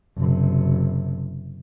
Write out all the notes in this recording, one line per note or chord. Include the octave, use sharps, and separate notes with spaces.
F#1 C3